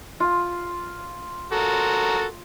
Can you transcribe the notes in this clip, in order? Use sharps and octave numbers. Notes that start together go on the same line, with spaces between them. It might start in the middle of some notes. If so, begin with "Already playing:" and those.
F4
F#4 A4 A#4